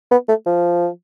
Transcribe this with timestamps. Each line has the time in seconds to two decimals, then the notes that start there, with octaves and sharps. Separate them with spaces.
0.11 B3
0.28 A3
0.46 F3